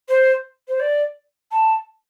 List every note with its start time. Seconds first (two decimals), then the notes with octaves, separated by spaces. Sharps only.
0.08 C5
0.68 C5
0.80 D5
1.52 A5